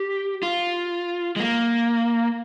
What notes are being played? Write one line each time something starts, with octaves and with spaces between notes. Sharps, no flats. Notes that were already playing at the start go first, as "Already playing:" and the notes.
Already playing: G4
F4
G#3
A#3